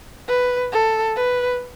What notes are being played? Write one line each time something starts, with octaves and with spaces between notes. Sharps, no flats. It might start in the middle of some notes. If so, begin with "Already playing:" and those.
B4
A4
B4